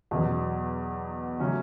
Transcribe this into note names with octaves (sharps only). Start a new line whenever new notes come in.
E2 B2 F#3
C#3 F#3 A3 C#4